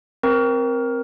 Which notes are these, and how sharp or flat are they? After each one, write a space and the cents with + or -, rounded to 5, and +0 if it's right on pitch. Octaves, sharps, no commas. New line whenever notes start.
C4 +0 A#4 +15